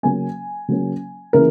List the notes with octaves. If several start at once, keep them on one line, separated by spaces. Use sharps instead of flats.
C#3 F#3 A#3 C#4 G#5
C#3 F#3 A#3 C#4
C#3 E3 A#3 A#4